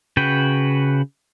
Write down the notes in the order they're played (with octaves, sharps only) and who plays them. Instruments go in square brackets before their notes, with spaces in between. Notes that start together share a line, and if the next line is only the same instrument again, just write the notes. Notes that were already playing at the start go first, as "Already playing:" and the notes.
[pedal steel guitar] C#3 F#4 B4 G5